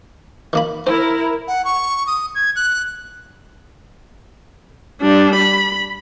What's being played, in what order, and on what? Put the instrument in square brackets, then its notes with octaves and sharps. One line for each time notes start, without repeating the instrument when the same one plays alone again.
[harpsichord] D#3 A#3 B5
[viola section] E4 A#4 [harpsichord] C5
[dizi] F#5
C#6
D#6
G#6
F#6
[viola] G3 D4
B5